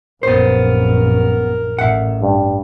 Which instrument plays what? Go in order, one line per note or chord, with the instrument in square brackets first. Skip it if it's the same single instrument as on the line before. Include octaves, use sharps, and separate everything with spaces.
[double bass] A#1 F#2 [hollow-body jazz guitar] B3 C5 [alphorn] A#4
[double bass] A1 [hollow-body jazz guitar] E5 F#5
[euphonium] G2